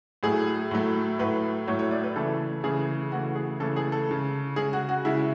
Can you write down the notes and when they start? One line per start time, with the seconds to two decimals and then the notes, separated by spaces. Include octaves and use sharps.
0.23 A2 F#3 A3 G#4
0.71 A2 F#3 A3
1.19 A2 F#3 A3 B4
1.67 A2 F#3 A3 C#5
1.79 C#5
1.91 D5
2.04 B4
2.16 C#3 E3 A3 A4
2.64 C#3 E3 A3 G#4
3.12 C#3 E3 A3 F#4
3.36 G#4
3.60 C#3 E3 A3 A4
3.76 G#4
3.92 A4
4.08 C#3 G#3
4.56 C#3 G#3 G#4
4.73 F#4
4.89 F#4
5.05 C#3 G#3 E4